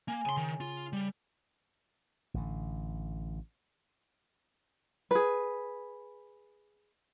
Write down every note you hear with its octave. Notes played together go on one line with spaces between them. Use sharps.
A#3 G#5
C#3 G#5 C6
D#3
F4
G3
A1 D3
G#4 B4